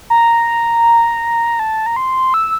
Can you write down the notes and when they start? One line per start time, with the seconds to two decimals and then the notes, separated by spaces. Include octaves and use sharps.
0.10 A#5
1.59 A5
1.86 A#5
1.96 C6
2.34 E6